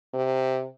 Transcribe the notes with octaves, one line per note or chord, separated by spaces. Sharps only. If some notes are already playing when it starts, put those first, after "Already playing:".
C3